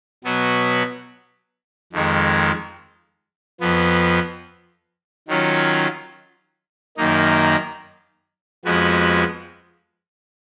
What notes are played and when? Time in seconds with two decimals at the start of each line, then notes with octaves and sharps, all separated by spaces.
0.24 B2 F#3 B3 F#4
1.93 F2 D#3 G#3
3.61 F2 F3 B3
5.28 D#3 F#3 C#4 F4
6.97 F#2 D#3 A#3 D#4
8.65 F2 F3 G#3 B3 F#4